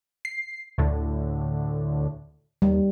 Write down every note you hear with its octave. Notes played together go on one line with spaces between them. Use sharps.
C7
D2 A2 D3
D#2 G3